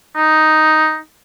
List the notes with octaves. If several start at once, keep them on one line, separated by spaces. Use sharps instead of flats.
D#4